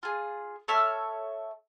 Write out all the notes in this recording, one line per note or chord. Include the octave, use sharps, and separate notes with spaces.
F4 G#4
A4 C#5 E5 F6